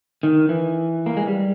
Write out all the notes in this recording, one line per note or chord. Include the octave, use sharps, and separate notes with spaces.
D#3
E3
A#3
G#3
G3